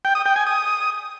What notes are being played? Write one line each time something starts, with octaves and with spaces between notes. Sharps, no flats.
G5
D#6
G5
G#5
D#6